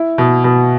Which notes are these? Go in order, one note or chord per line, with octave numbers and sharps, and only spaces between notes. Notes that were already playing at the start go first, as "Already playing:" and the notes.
Already playing: E4
B2
B2